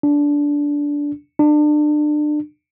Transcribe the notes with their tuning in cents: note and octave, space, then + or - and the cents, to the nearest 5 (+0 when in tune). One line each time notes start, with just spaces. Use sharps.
D4 -15
D4 +30